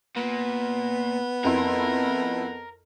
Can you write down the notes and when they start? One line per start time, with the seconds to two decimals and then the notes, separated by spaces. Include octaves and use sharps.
0.16 A#2 B3
1.44 F2 E4 A#4 C6